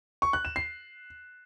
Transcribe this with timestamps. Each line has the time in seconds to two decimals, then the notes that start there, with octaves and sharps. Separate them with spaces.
0.22 C#6
0.33 F#6
0.45 E7
0.56 C7